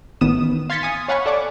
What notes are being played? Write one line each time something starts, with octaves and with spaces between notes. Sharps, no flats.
A1 D#3 B3 D#6 E7
F5 C6 G#6 A6 B6 C#7
G#5 D#6
C#5 F5 F#5 G#5 B5 C#6
A4 D5 F#5 D6